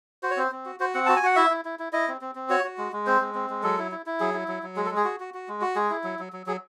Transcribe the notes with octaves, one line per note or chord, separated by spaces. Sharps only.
F#4 C5
C#5
C4 C5
C4
F#4
F#4 C5
C4 F#5
F#4 A5
G#5
F#4 F#5
E4 E5
E4
E4
E4
E4 D#5
C4
C4
C4
F#4 C#5
F#4
G#3
G#3
C4 C5
G#3
C4
G#3
F#3 A4
E4
E4
E4
F#3 G#4
E4
F#3
F#3
G#3 G#4
A4
G#3
G#4
F#4
F#4
F#4
G#3
F#4
G#3 G#4
E4
F#3
F#3
F#3
F#3 G#4